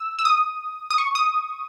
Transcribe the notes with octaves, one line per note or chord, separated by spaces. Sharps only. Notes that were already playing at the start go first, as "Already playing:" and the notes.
Already playing: E6
E6
D#6
D#6
C#6
D#6